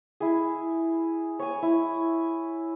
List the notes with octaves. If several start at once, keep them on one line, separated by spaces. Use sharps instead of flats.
E4 G#4
C#5 G#5
E4